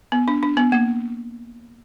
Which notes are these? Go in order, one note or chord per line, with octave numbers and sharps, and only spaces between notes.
B3
D4
D4
B3
A#3